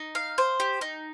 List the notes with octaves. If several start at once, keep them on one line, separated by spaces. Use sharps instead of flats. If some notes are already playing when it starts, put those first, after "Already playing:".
Already playing: D#4
F5
C5
G4
D#4